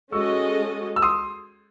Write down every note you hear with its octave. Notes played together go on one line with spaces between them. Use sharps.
G#3 C#4 F#4 A4 D#5 C#6 E6
E6
C6 D#6